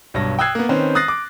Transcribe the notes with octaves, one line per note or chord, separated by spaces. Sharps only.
B1 G2 C#5 A#6
G5 D#6 E6 F#6 G#6 C7
A#3 B3
D#3 C4 C#4 B4 C5
D#6 F#6 A6 A#6 C7
D6